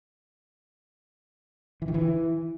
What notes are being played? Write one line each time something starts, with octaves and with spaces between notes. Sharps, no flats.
E3
D#3
E3